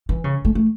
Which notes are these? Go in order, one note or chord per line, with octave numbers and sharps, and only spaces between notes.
E3
C#3
A3
A3